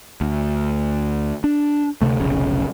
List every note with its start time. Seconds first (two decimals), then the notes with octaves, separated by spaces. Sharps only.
0.21 D2
1.44 D4
2.02 D2 C3 A3
2.20 F1 B1 C#3